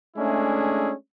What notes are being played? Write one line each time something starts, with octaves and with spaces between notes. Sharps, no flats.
G#3 A3 C#4 D4 E4 G#4